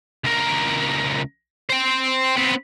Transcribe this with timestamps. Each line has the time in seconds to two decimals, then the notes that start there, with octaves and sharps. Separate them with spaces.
0.24 C#2 A#4
1.70 C5 G5
2.37 B3 C4